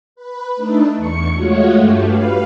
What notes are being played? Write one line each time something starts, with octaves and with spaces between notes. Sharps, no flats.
B4
A3 D4 D#4 A4
E2 C#6 C#7
G#3 A3 F4 F#4 C#5
G2 A3 G4
B4 F5